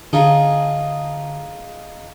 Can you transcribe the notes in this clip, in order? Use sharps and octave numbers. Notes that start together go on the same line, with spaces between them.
D3 D#4 F4 G#4